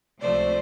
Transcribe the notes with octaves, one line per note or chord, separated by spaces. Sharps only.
C#2 C3 F3 A3 C5 D5